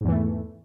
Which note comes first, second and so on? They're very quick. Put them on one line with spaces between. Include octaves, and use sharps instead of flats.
G#2 E2 E3 A3